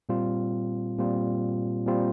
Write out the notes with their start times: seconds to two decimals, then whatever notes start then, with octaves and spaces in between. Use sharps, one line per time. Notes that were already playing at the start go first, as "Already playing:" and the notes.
0.09 A#2 G3 C4 F4
0.98 A#2 G3 C4 F4
1.86 A#2 G3 C4 F4